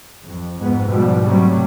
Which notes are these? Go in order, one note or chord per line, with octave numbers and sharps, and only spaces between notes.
F2
F2 G#2 B3
G#2 B2 F3 G3
C3 F#3 G3 A3